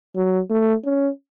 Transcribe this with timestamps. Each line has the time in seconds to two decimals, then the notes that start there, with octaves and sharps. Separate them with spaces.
0.16 F#3
0.50 A3
0.85 C#4